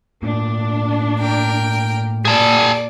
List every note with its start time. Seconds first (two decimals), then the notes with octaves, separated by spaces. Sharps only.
0.23 A2 A#3 D4
1.20 A#4 G5
2.25 A#2 G#4 D5 A5